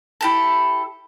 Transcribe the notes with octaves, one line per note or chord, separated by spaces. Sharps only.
E4 G4 A4